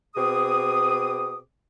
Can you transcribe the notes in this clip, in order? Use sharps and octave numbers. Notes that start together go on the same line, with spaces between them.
B2 C4 G#4 D6 D#6